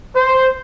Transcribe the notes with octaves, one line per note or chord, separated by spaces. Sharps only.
C5